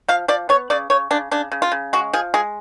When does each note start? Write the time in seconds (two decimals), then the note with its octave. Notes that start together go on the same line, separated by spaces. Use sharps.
0.08 F3 F5
0.28 F3 D5
0.49 B3 C#5
0.70 C#3 D5
0.90 C#3 C#5
1.11 C#3 D4
1.31 C#3 D4
1.52 C#3
1.62 F4
1.72 C#3
1.93 G#3 F#4
2.13 F3 G#4
2.34 G#3 G#4